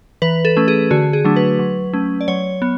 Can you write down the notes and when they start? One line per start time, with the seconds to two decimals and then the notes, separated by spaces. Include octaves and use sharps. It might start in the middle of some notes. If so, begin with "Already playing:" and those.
0.22 E3 B4
0.45 A4
0.57 A3 C#4
0.68 G#4
0.91 D3 F#4
1.13 G#4
1.25 F#3 A3 D4
1.36 B4
1.59 F#3
1.93 A3 C#4
2.21 D5
2.28 F#3 C#5
2.62 B3